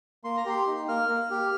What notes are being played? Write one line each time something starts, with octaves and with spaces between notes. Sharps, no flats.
A#3 C6
A#5
G4 C6
D#4
A#3 F6
A#3
G4